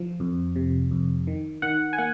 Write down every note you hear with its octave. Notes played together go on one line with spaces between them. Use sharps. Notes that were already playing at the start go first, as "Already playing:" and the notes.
Already playing: F3
F2
C3
F2
D#3
D#3 F#5
G#5
A#3 F#5